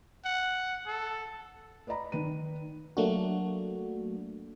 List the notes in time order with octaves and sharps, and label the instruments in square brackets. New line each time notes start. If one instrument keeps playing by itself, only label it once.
[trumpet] F#5
A4
[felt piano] B4 D5 D#5 A#5 B5
D#3 B4 D#7
[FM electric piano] F#3 A3 A#3 D4 F#4